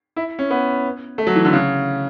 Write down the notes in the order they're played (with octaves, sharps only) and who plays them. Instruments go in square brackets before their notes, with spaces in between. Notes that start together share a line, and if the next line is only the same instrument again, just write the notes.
[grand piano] E4
C#4
B3
A3
F#3
E3
D3
C#3